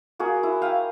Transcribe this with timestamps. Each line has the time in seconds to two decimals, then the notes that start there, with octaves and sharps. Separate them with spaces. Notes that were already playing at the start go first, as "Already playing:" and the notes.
0.19 A#3 F#4 G#4 A#4
0.43 E4
0.62 F5 G5 D#6